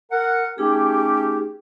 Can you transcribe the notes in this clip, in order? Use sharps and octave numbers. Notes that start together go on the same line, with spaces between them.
A#4 F#5
A3 C#4 D#4 G4 G#4